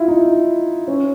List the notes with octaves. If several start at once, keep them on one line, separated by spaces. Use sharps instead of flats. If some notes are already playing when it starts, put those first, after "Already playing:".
Already playing: E4 F4
D#4
C#4